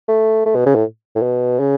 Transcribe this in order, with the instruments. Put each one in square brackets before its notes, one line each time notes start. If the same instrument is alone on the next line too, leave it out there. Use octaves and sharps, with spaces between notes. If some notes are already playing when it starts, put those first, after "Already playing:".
[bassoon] A3
A3
B2
C#3
A2
A2
B2
C#3